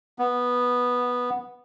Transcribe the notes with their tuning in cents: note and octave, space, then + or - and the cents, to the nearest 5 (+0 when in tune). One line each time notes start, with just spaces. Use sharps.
B3 -5